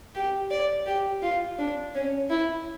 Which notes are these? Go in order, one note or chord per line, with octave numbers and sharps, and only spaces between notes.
G4
D5
G4
F4
D4
C#4
E4